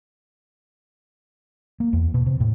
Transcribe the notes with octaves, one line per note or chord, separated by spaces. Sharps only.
A#3
E2
B2
C3
A2